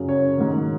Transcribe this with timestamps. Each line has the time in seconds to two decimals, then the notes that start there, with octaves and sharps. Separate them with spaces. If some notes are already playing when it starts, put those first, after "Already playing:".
Already playing: F#2 C#3 F#3
0.09 C#5
0.38 G#2 D#3 F#3